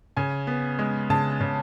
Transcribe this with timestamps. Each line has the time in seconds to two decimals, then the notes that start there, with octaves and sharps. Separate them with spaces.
0.17 C#3 G#5
0.47 B3
0.79 G#3
1.10 C#3 A5
1.41 C#3